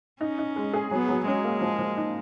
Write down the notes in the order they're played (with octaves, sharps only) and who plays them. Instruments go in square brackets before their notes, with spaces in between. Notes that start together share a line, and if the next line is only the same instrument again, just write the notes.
[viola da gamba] C#4 [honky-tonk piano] D#4
[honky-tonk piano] D#4
G#3
G#4
[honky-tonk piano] F#3 [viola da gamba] B3
[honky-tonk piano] F#3
[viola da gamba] G#3 [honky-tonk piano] C#4
[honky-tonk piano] A#3
F3
F3
D#4